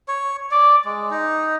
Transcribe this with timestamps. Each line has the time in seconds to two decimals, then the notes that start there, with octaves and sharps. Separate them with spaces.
0.08 C#5
0.51 D5
0.85 G#3
1.11 D#4